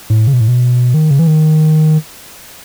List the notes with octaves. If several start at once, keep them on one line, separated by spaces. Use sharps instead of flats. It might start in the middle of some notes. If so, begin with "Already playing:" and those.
A2
C#3
B2
A2
B2
D#3
C#3
E3
D#3